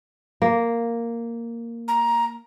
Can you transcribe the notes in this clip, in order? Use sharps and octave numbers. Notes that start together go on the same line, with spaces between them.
A#3
A#5